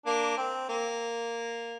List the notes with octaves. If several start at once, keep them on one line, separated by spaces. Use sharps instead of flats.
A#3 D4
C4
A#3